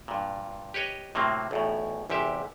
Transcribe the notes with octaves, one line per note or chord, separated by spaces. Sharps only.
G2 A#2
G4 B4 C#5 D#5
A2 C3 F#3 A#3 C4
B1 E2 A2
G#1 E2 C3 G4 E5